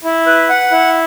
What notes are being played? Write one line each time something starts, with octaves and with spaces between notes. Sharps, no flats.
E4
B4
F#5
E4